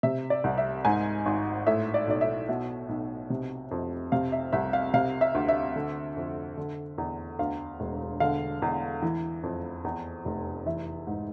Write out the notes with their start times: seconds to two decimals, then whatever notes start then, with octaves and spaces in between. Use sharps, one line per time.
0.03 C3 E5
0.30 D5
0.44 C2
0.58 E5
0.85 G#2 G#5
1.26 G#1
1.67 A2 E5
1.94 D5
2.07 B1 D5
2.21 E5
2.48 B2 E5
2.89 B1
3.30 C3
3.71 F2
4.12 C3 F5
4.32 E5
4.53 C2 E5
4.73 F5
4.94 C3 F5
5.21 E5
5.35 D2
5.49 E5
5.76 D3
6.17 F2
6.57 D3
6.98 E2
7.39 D2 F5
7.80 E1
8.20 D3 F5
8.62 E2
9.02 E3
9.43 F2
9.84 E2
10.25 F1
10.66 E3 E5
11.07 G#2